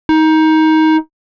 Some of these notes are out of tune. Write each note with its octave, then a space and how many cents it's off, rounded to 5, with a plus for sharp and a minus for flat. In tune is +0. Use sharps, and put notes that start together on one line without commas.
D#4 +20